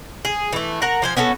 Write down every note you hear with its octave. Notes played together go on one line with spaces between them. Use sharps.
G#4
E3 A3
A#4 F#5 A#5
F3 C5 G#5
B3 C#4 F#4 A4